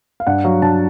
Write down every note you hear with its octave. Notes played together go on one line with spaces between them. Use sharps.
F5
G2 F#5
F#3 F5
G2 A5